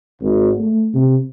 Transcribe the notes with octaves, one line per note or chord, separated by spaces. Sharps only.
G#1
A3
C3